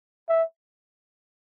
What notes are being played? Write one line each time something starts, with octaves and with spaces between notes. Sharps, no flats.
E5